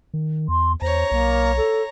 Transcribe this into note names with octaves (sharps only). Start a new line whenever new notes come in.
D#3
E2 C6
E2 C5 C#5 A#5
B1 A#3
A4